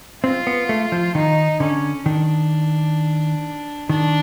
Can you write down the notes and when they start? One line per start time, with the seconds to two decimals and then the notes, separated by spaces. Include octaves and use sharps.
0.23 C4 F4
0.47 B3
0.69 A3
0.92 F3
1.15 D#3 D#4
1.60 D3 C#4
2.06 D#3 D4
3.89 D#3 D4